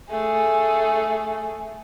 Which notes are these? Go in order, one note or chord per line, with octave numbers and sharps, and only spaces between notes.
A3 G#4